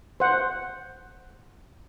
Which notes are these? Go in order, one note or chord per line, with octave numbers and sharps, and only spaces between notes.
C5 F#5